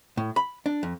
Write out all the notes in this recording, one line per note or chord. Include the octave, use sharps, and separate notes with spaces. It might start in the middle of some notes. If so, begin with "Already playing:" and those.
A2
B5
D4
F2